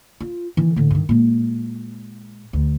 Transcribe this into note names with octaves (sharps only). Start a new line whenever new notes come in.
F4
D#3 E3
A2 D3
G2 D#3
A#2 G#3
D2